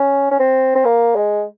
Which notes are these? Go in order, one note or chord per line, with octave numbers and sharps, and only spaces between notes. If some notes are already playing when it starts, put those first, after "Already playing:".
Already playing: C#4
C#4
C4
C4
A#3
G#3